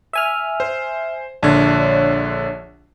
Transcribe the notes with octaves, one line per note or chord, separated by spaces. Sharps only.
E5 G#5 F6
C5
A#1 D3 D4 C#5